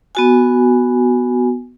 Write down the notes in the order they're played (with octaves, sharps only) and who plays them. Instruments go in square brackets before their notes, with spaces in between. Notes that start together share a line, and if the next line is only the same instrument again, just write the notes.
[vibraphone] B3 F#4 G#5